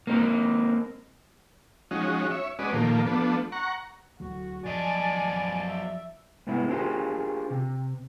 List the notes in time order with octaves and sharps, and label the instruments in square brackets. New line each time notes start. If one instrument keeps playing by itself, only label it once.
[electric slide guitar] A#3 C4 D#4 F4 A#4
[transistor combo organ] F3 G#3 C#4 D#4 F#4
C#5 E5
G#3 C#4 F#4 B4 D5 D#5
A#2 D#3 F3 A3 A#3
F3 A3 B3 D4
F#5 A#5 C#6
[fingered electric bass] D2 F#3 A3 [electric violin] F#4
[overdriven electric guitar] F#2 D#5 [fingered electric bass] F3 [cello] D5 [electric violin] G#5 A5
[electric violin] E5
[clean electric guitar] G#2 C3 B3 C4 E4
D4 F4 G4 G#4 A#4 C5
C3